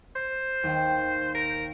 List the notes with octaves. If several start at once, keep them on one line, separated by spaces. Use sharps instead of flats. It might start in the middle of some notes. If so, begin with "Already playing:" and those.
C5
D#2 G5
A#4